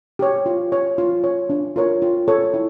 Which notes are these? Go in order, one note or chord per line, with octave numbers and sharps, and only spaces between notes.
G4 C#5
F4
C#5
F4
C#5
D4
F4 A#4 C#5
F4
A4 C#5
E4